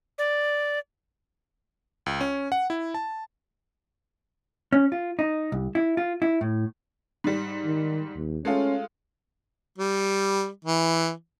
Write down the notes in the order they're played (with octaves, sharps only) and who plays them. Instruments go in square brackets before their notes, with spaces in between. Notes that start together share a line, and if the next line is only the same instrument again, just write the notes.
[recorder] D5
[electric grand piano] C#2
C#4
F#5
E4
A5
[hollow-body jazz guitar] C#4
F4
D#4
C2
E4
F4
E4
A2
[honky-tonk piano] G#2 G3
[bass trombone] D#3
D#2
[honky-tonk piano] G#3 A3 F4 [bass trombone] C#4
[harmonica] G3
E3